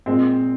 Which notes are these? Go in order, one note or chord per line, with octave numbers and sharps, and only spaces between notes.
A#2 G#3 C4